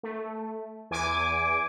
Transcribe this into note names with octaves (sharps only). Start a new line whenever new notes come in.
A3
E2 G#5 D6